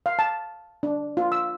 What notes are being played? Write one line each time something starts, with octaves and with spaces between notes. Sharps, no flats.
F5
A5
D4
F4
E6